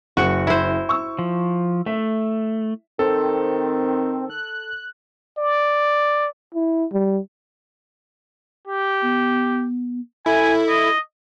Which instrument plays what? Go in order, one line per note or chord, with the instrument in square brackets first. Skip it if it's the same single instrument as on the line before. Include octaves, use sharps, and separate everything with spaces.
[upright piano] F#1 C#7 [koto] F#4
[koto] E4 C5
[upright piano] C#6 E6
[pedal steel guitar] F3
[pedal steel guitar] A3 [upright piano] E5
[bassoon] D#3 [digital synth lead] C4 [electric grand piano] A4
[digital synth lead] F#6
[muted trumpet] D5
[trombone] E4
G3
[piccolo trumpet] G4
[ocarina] B3
[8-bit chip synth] E4 [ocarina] A4 [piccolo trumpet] G#5
[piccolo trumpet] D#5